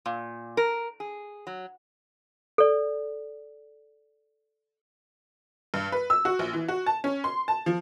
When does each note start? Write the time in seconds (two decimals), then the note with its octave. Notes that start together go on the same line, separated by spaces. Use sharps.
0.06 A#2
0.57 A#4
1.00 G#4
1.47 F#3
2.58 A4 D5
5.74 G2
5.92 B4
6.10 E6
6.25 F#4
6.39 A#1
6.53 E3
6.68 F#4
6.86 A5
7.04 C#4
7.24 C6
7.48 A5
7.66 F3